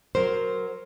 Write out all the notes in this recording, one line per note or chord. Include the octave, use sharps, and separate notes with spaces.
F#3 A#4 C5